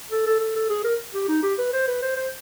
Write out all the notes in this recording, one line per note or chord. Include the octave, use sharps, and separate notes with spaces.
A4
A4
A4
A4
G#4
A#4
G4
D#4
G4
B4
C5
B4
C5
C5